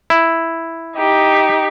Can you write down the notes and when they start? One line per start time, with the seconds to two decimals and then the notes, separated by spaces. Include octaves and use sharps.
0.10 E4
0.95 D#4 G4